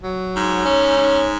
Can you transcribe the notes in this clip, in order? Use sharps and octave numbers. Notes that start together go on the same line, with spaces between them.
F#3
G#2
C#4
G#2